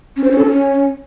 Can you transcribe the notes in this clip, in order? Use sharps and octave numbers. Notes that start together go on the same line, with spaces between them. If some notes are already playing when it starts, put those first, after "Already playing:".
C#4
C5
C#4
A4
C#4